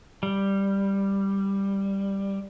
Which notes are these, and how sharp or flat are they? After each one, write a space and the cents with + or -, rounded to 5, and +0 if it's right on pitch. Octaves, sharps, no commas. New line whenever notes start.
G3 +5